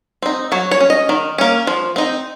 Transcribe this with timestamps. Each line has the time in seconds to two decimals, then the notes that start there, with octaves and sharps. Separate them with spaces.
0.22 C4 D#4
0.52 F#3 C#5
0.71 C#5
0.81 C#4
0.90 D#5
1.09 D#3
1.38 A#3 C#4
1.67 F3
1.96 C4 D#4